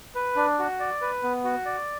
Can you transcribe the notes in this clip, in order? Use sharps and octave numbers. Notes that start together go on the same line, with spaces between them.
B4
D4
F#4
D5
B4
B3
F#4
D5